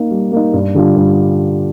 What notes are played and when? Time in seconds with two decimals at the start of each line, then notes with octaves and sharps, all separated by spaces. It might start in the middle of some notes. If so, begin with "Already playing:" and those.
Already playing: A#3 D#4
0.11 G3
0.32 A#3 D#4
0.53 G2
0.75 D3 G3 D4 F4
0.96 G2